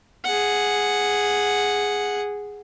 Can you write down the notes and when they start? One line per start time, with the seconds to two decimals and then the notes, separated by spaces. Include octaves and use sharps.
0.25 G#4 F#5